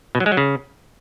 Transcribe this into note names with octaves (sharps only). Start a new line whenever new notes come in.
B2
F#3
G#3
F#3
C#3